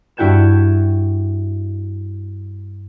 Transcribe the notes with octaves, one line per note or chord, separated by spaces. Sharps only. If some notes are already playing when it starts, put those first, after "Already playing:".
G2 E4 F#4 G5 G#6 E7